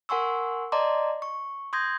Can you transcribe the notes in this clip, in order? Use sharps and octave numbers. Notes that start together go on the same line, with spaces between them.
A#4 F#5 G#5 C6 C#6 E6
D5 D#5 A5 A#5 C6 D6
C#6
C6 D#6 G6 G#6 A#6